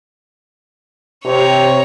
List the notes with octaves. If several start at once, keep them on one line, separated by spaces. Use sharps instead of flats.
C3 C#5 A#5